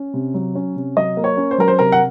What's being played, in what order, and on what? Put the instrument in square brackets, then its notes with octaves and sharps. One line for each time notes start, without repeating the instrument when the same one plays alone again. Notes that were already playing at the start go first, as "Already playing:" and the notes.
Already playing: [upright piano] C#4
C3
F#3
C#4
C3
F#3 D#5
A#3
C#5
C#4
C5
F#3 A#4
C5
C3 A#4
F#5